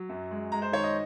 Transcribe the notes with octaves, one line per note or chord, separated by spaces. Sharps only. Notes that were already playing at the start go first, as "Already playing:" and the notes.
Already playing: F#3
F#2
G#3
G#3 A#5
C5
D#3 C#5
D#5